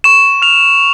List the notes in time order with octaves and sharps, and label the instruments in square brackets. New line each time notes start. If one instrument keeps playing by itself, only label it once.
[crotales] C#6 E7
F6 F7